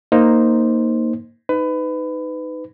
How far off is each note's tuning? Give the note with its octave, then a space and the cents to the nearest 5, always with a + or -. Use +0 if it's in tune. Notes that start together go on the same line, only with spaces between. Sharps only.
A#3 -5 D#4 +0 C5 +0
D#4 +0 B4 +25